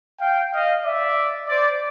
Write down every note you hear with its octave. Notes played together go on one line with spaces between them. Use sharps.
F5 G5
D#5 F5
D5 E5
C5 D5